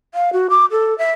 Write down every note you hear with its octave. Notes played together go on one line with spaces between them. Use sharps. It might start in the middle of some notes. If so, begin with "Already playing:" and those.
F5
F#4
D6
A4
E5